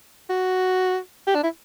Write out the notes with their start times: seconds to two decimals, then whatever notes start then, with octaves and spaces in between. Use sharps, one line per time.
0.30 F#4
1.27 G4
1.35 D4
1.43 E4